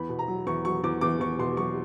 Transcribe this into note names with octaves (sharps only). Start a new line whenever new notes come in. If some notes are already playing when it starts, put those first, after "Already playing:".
Already playing: E2 B5
B2
A#5
F#3
E2 C#6
F#3 C#6
E2 D6
E2 D6
E2 C#6
B2 C6
F#3 C#6